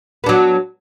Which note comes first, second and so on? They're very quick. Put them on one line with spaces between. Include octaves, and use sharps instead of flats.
B3 D4 F#3